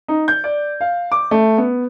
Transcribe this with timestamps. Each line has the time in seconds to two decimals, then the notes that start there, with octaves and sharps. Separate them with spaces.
0.08 D#4
0.28 G6
0.44 D5
0.81 F5
1.12 D6
1.31 A3
1.58 B3